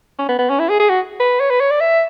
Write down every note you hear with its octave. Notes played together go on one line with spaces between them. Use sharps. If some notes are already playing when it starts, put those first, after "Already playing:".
C#4
B3
B3
C#4
E4
G#4
G#4
F#4
B4
C#5
B4
C#5
D5
E5